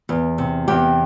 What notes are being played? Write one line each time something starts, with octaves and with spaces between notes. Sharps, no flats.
E2
C3
E2 G4